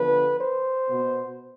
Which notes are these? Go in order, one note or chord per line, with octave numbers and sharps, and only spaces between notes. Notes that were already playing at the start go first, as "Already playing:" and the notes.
Already playing: D3 F3 B3 B4
C5
B2 B3